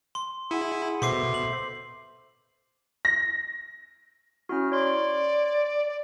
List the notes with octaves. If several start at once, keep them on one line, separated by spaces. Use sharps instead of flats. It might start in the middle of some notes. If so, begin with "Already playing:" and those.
C6
E4 G#4 F#5 G#5
B2 A4 C5 E5 C6 D6 C7
F#7
A#6
C#4 E4 F#4 F6
C#5 D5 C6
D5